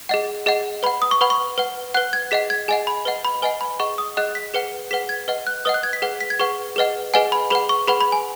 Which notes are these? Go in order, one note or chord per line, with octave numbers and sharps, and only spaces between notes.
G#4 D#5 F#5
G#4 D#5 F#5
B4 F#5 B5
D#6
C#6
B4 F#5 B5
C#6
B4 F#5
B4 F#5 F#6
G#6
G#4 D#5 F#5 B6
G#6
G#4 D#5 F#5 G#5
B5
B4 D#5 F#5
B5
B4 D#5 F#5 G#5
B5
G#4 D#5 F#5 C#6
D#6
G#4 D#5 F#5 F#6
B6
G#4 B4 F#5 C#7
G#4 B4 F#5 B6
G#6
B4 D#5 F#5
F#6
B4 D#5 F#5 D#6
F#6
G#6
B6
G#4 B4 F#5
B6
G#6
G#4 B4 F#5 C#6
G#4 B4 D#5 F#5
G#4 B4 D#5 F#5 G#5
B5
G#4 B4 F#5 B5
C#6
G#4 B4 F#5 B5
B5
G#5